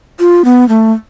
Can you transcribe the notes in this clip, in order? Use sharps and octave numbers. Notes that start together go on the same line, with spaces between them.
F4
B3
A3